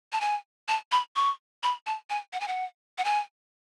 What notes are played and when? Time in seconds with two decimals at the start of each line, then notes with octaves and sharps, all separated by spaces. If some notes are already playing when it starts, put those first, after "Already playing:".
0.12 A5
0.21 G#5
0.68 A5
0.92 B5
1.16 C#6
1.63 B5
1.86 A5
2.10 G#5
2.33 F#5
2.40 G#5
2.48 F#5
2.98 F#5
3.05 G#5